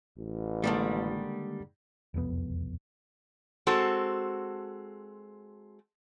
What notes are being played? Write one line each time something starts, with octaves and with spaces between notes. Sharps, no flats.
A1
D3 D#3 G3 G#3 A#3
E1 C2 F2 B3
G#3 C4 F#4 A4